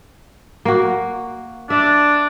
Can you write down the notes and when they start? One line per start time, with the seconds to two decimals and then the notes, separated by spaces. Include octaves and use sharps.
0.65 A#3 F#4
1.70 D4 E5